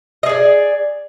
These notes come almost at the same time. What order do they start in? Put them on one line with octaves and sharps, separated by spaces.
D#5 G#4 D5